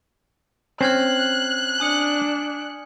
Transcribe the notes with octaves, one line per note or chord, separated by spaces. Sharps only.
C4 C#4 C5 F6 F#6 G#6 C7
D4 G#5 D#6 C#7